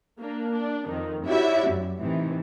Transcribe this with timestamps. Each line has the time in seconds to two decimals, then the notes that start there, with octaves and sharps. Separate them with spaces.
0.19 A#3 D4
0.52 D4
0.87 F2 D#3
1.25 E4 F#4 G4 C#5 D5 E5
1.68 F#2
2.01 A2 C3 D#3 E3